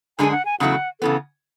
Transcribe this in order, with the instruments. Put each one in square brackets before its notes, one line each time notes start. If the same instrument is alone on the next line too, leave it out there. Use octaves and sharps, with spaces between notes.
[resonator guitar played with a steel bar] F#2 D3 G#3 D4 G#4 [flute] G#5
[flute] F#5
G#5
[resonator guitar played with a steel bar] E2 C#3 F#3 A3 E4 [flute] F#5
[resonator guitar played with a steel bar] C#3 E3 B3 [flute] A4